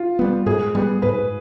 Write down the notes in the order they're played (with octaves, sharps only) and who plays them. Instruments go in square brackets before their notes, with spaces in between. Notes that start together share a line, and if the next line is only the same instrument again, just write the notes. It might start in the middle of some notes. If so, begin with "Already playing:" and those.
Already playing: [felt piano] F4
[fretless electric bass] G3 B3
[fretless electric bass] G#2 [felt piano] G#4
[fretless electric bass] G3 B3
[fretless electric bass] G#2 [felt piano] B4